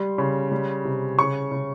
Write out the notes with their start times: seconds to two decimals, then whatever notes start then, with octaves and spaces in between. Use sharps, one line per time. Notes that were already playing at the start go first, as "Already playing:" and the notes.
Already playing: G3 C6
0.18 C#3
0.52 G3
0.85 C3
1.19 C#3 C#6
1.51 C#3